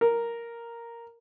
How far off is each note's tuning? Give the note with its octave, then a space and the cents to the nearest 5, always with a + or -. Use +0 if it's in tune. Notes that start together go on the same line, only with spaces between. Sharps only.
A#4 +0